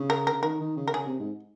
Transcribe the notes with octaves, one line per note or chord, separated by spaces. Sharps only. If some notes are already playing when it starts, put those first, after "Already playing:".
Already playing: C#3
A#4
C#3 A#4
D#3 A#4
D#3
C#3
A#4
C#3 G#4
C3
G#2